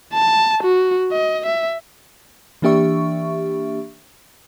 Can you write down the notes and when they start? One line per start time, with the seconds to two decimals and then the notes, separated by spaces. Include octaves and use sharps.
0.14 A5
0.63 F#4
1.12 D#5
1.46 E5
2.62 E3 A#3 D4 G4 E5 C#6